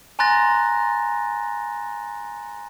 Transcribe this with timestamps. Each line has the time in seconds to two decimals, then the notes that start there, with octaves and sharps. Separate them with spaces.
0.19 G#5 A#5 C6 F#6 A6 A#6